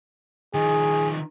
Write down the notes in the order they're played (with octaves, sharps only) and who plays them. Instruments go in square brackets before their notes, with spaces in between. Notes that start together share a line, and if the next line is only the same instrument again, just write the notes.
[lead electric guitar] D#3 F3 [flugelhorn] G#4